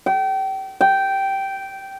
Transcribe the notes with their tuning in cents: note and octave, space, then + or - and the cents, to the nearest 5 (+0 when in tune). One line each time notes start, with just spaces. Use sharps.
G5 -30
G5 -10